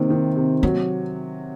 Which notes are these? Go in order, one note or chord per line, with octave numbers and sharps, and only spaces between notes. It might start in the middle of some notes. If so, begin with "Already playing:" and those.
Already playing: C3 D#3 A#3 C4
D#3
C3
F#3 A#3